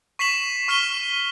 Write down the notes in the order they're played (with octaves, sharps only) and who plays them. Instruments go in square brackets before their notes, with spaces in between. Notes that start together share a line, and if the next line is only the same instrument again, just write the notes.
[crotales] C#6 B6 C7 E7 F#7
C#6 F6 B6 D#7 G7